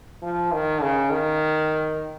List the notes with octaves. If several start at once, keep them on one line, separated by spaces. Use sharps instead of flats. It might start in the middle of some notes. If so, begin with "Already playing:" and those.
F3
D#3
C#3
D#3